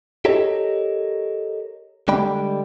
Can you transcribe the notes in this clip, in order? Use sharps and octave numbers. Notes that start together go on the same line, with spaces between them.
G4 A4 A#4 C#5 D#5
D3 G3 G#3 D5 G5 B5